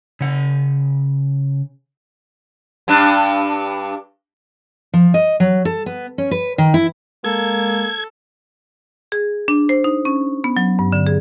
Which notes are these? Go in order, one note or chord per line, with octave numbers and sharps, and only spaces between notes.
C#3 F#5
G2 D4
F3
D#5
F#3
A4
B3
C#4
B4
D#3
E4
G#3 A#3 A4 G#6
G#4
D4
C5
D#4
C#4
B3
F#3
G2
D3
G#4